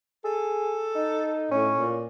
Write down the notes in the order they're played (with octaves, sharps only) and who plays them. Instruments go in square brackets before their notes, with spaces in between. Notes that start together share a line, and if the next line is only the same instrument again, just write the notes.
[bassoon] G#4 [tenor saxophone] A4
[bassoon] D#4
[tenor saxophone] A2 [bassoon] C#4
[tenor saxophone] A#2